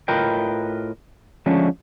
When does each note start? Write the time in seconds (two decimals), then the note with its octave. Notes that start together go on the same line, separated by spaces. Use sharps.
0.08 A2 F4 A#4 B4 D#5 G5
1.46 D3 F3 G#3 A3 C#4